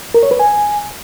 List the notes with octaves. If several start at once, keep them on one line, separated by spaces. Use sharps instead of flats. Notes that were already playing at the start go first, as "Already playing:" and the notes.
A#4
C#5
B4
G#5